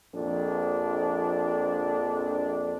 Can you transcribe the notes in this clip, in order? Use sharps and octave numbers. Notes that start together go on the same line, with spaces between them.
A#1 F2 D4